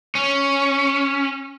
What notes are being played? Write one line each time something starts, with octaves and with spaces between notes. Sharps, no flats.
C#4